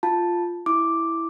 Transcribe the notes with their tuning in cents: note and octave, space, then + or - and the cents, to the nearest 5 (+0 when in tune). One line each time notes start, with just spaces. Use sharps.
F4 +0 A5 +0
E4 +0 D6 +0